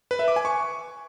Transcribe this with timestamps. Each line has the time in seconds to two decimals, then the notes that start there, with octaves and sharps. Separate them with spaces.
0.11 B4
0.19 E5
0.28 D6
0.36 G#5
0.45 C#6